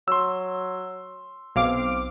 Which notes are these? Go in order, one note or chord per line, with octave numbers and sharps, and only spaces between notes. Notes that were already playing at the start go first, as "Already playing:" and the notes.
F#3 C6 E6
B1 C4 F5 D6